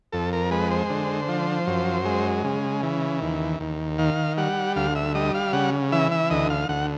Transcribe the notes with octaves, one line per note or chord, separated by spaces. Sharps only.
F2 A4
A#4
G#3 B4
C5
D3
F3
F#2
G#3
C#3
E3
D#2
D#2
D#3 F5
G3 F#5
D2 F5
E5
G3 D#5
F5
C#3 F#5
E3 E5
E5
D2 D#5
F5
D2 F#5